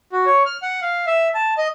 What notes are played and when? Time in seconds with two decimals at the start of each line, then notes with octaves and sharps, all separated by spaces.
0.13 F#4
0.26 C#5
0.46 F6
0.63 F#5
0.82 F5
1.07 E5
1.34 A5
1.57 D#5